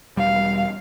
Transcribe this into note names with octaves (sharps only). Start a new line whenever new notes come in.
E1 G3 F5